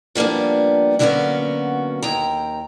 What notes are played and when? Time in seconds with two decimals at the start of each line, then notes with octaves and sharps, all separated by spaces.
0.15 F3 G3 A#3 B3 D4
0.99 D3 F#3 A#3 B3 C#4 F#4
2.03 D#2 G5 A#5